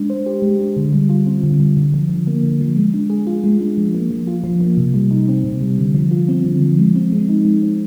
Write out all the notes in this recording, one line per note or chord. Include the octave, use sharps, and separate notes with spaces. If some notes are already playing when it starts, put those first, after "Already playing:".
Already playing: G#3 D4
C5
G4
G#3
D4
D3
G3
F4
C4
D3
G3
D3
F3
D3
A#3
D3
F3
G#3
D4
G#4
F4
G#3
D4
F3
A#3
F3
F4
F3
A#3
C3
G3
D#4
C4
C3
G3
D3
F3
F4
C4
D3
F3
G#3
C4
G#3
D#4
G#3
C4